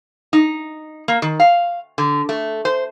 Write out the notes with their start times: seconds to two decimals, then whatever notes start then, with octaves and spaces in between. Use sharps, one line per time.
0.33 D#4
1.08 A#3
1.22 D#3
1.40 F5
1.98 D3
2.29 A3
2.65 C5